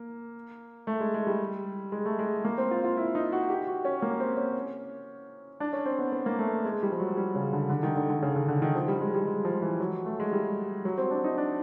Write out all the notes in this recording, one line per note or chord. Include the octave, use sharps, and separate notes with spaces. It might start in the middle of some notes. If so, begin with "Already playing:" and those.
Already playing: A#3
A3
G#3
G#3
G3
G#3
A3
G#3
A#3
C4
F4
F4
E4
D#4
F#4
G4
F#4
C#4
A#3
C4
C#4
D4
C#4
C4
B3
B3
A#3
A3
G#3
G3
F3
F#3
G3
C#3
D3
D3
D#3
D3
D3
C#3
D3
D3
D#3
F3
G3
G#3
G3
G#3
F3
E3
F#3
A3
G#3
G3
F#3
C4
D4
D#4
D4